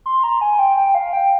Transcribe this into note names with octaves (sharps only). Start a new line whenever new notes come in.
C6
A#5
G#5
G5
G5
F5
G5